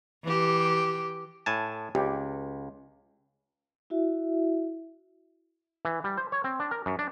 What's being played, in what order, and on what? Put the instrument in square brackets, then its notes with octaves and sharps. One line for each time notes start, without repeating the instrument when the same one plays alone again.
[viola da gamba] E3 G4
[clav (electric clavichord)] A2 G#5 A5
[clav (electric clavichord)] C#2 [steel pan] G4
[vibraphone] E4 F#4 E5
[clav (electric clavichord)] E3
G3
C5
C#5
C4
D4
A#4
F#2
D4